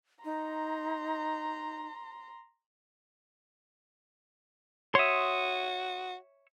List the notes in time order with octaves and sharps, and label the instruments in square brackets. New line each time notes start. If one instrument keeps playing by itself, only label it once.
[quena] D#4 [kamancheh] A#5 C6
[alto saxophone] F#4 [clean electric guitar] C#5 E5 [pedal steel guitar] C6 D#6